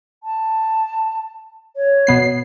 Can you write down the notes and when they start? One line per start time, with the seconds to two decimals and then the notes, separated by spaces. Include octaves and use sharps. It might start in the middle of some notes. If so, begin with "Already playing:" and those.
0.24 A5
1.77 C#5
2.07 B2 B3 C7